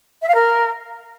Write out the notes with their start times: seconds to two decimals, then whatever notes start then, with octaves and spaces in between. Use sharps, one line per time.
0.22 E5
0.29 F5
0.35 A#4